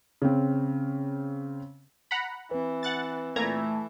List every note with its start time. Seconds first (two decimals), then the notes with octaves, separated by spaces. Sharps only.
0.22 C#3 C4
2.11 F#5 A#5 B5
2.51 E3 C4 B4
2.83 F#5 F#6 A6
3.36 A#2 E3 A3 A#5 G#6